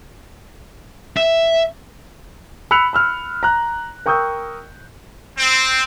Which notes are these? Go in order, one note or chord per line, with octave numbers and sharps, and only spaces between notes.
E5
B5 E6 F#6 C#7 F7
B5 E6 F6
A#5 F#6
A#4 G5 C#6 D#6 E6 G6
C4